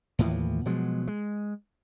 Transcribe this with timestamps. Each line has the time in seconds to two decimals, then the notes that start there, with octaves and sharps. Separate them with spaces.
0.19 D#2 A2 E3 F3
0.66 B2 F3 F#3 G#3
1.08 G#3